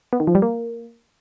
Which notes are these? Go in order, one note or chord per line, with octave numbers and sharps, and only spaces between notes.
B3
D#3
F3
G3
A#3